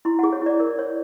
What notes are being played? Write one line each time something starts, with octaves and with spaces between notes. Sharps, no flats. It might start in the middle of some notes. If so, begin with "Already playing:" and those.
E4 C6
F#5
G#4
C#5
E4 D5
A#4
C#5